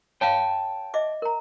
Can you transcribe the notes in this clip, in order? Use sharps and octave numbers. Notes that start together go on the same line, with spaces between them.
C#5 F5 G5 A5
D#5 E5 D6
A#4 A#5